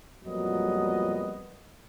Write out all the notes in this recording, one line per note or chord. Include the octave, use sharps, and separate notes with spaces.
F2 A#2 F#3 G3 B3 D#5